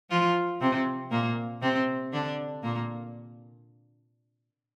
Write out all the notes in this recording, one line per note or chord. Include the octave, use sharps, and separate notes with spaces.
F3 F4
C3 C4
A#2 A#3
C3 C4
D3 D4
A#2 A#3